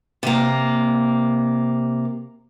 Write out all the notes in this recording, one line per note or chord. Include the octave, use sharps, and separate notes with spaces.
C3 A#3